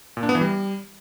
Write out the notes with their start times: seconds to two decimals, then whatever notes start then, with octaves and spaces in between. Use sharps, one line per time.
0.17 A#2
0.23 D4
0.29 B3
0.35 E3
0.41 G3